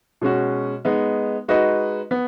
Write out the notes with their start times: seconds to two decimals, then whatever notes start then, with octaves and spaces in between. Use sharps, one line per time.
0.21 B2 G#3 C#4 F#4
0.85 G#3 B3 D#4
1.48 G#3 D#4 F#4 B4 D#5
2.11 B3